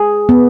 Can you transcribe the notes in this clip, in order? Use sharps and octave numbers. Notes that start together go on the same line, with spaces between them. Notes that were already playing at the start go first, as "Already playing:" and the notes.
Already playing: G#4
B3